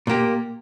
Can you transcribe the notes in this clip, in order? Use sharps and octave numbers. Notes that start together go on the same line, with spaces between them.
A#2 A#3 G4